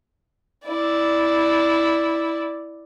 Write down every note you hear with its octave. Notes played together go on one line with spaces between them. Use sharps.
E4 D5